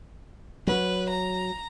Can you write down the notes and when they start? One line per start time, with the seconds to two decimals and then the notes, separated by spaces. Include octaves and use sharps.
0.67 F#3 B4
1.10 A#5